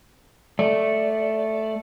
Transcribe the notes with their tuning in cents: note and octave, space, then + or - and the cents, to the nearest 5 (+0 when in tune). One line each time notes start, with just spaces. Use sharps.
A3 +0 D5 +0